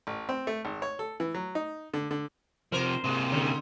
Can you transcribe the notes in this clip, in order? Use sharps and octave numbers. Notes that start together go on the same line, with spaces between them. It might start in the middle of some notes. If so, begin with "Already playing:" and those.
A1
C4
A3
G#1
C#5
A4
E3
F#3
D#4
D3
D3
C3 F3 A#4 C5
C3 G#3 A#3
G#2 D3 C#4